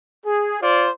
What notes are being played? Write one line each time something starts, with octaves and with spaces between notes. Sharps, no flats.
G#4
F4 C5 D5